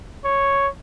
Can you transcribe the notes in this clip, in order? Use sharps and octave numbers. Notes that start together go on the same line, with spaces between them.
C#5